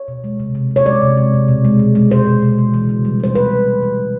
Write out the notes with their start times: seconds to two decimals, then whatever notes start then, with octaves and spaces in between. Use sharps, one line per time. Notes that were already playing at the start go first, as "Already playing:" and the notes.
Already playing: C#5
0.08 B2
0.24 G#3
0.40 C3
0.55 C3
0.71 C3
0.76 C#5
0.86 G#3 D5
1.02 C3
1.17 G#3
1.33 C3
1.48 B2
1.65 G#3
1.79 B2
1.95 G#3
2.10 B2 C5
2.27 B2
2.42 B2
2.58 G#3
2.74 E3
2.89 C#3
3.05 G3
3.20 G3 C5
3.35 C#3 B4
3.50 G3
3.67 C#3
3.82 E3
3.98 G3